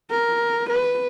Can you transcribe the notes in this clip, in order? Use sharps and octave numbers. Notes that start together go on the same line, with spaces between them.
A#4
B4